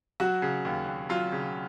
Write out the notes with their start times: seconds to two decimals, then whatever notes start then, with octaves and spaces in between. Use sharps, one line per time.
0.20 F#3 F#4
0.42 C#3
0.65 D#2
0.87 D#2
1.09 F#3 F4
1.32 C#3